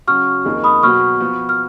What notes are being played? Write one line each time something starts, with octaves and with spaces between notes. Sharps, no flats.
C#3 F#3 C#4 F#4 C#6 F6
F2 D#3 A#3 D#4 G#4
B5 D#6
B2 F#3 B3 F#4 C#6 F6
F3 B3 F#4
F6